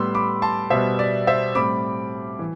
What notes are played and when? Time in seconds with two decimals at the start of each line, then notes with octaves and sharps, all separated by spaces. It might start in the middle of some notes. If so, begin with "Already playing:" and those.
Already playing: A2 G3 B3 C6 E6
0.15 B5 D6
0.42 A5 C6
0.70 B2 G3 B3 C5 E5
0.99 D5
1.27 C5 E5
1.55 A2 G3 C4 B5 D6
2.39 E3